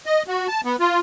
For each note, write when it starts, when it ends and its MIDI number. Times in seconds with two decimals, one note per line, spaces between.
0.06 0.23 75
0.28 0.47 66
0.48 0.61 81
0.65 0.76 59
0.80 1.00 65